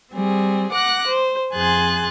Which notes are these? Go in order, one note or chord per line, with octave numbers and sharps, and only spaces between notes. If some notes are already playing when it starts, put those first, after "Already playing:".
G3 C4 G#4
F#5 D6 F#6 A#6
C5
F2 G#4 G#5 C6 F#6 A6